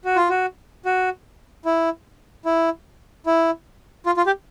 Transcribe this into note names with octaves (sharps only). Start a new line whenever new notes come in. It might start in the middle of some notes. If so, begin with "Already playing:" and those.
F#4
F4
F#4
F#4
E4
E4
E4
F4
F4
G4